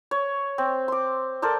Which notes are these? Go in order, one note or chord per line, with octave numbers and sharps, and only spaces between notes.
C#5
C4
C6 D6
A4 A#4 C5 D5